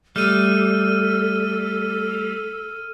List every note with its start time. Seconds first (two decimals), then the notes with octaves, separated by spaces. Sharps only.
0.16 G3 A3 A4 F6 D#7